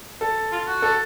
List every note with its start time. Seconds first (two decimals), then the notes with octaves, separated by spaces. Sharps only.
0.21 A4
0.52 F4
0.68 F#4
0.82 A4